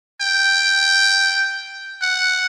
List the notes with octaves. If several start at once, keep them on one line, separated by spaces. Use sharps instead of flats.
G5
F#5